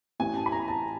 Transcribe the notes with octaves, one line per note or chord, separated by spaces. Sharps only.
A1 A2 E3 G#5
A5
B5
A#5
A5